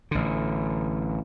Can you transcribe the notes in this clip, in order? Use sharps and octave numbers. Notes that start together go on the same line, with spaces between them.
A1 D3